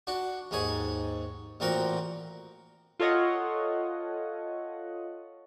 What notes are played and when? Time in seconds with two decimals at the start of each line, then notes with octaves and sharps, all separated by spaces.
0.07 D4 F#4
0.51 D#2 G#2 G#4 C#5
1.60 A1 A#2 C4 F#4 A#4 A#5
3.00 F4 A4 C#5 D#5 F#5